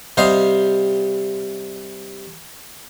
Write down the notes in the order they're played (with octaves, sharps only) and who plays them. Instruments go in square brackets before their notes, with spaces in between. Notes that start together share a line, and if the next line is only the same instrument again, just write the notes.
[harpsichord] C3 G3 C5 D#5 F5